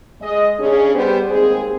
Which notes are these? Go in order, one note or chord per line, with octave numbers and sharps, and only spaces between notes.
G#3 D#5
C#3 C#4 D4 G#4
G3 B3 G4 C5
D#2 G#3 C4 G#4